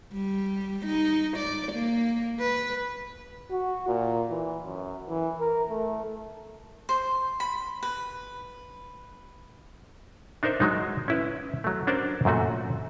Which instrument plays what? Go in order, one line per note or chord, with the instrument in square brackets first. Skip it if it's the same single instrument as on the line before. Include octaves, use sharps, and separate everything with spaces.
[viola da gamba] G3
D#4
D5
A#3
B4
[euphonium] F#4
A#2
E3
F#2
E3
A#4
A3
[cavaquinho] C5
B5
B4
[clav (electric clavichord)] D4 D#4 A#4 C5 D5 E5
F#3 G#3 D#4
C#4 E4 B4
F#3 A3
C#4 D4 F#4 A#4 C5 D5
F#2 A#2 A3 F#4